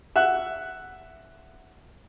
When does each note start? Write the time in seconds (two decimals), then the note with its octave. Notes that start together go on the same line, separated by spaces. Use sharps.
0.16 E5 F#5 F#6